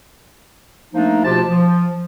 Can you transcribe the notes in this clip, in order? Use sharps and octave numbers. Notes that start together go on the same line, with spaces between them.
F3 A3 A#3 D4 D#4
D2 B2 F3 F4 G4 A5
F3